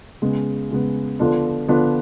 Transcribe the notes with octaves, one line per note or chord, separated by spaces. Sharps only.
C#3 G#3 B3
C#3 G#3 B3
D3 F3 B3 D4 F4
D3 F3 B3 D4 F4